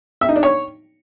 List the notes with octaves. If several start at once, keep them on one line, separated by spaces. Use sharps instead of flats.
E5
D#4
D4
C#5